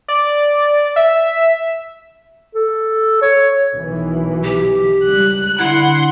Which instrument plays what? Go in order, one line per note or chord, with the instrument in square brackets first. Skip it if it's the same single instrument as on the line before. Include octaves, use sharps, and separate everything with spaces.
[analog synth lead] D5
E5
[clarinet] A4
C#5
[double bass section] B1 D#3 E3
[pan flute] G4
[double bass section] C#2 G3 [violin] F#6
[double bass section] D3 [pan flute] E4 [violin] F#5 C6